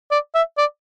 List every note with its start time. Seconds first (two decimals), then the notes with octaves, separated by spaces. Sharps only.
0.11 D5
0.35 E5
0.58 D5